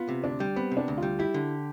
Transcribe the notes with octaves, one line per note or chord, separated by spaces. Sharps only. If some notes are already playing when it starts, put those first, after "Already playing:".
Already playing: B3 F4
C3
D2 D4
G3
B3 C4
C3
D4
D2
G3 F4
E4 G4
D3